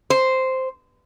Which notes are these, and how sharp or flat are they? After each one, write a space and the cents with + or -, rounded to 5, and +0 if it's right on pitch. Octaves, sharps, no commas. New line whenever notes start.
C5 -5